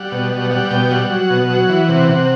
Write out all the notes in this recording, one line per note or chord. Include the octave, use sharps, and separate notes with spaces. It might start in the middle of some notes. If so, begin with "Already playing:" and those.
Already playing: G3 F#5
B2
G3
G3 F#5
B2 G5
G3 F#5
F#3
B2
F#3
E3
C3
C3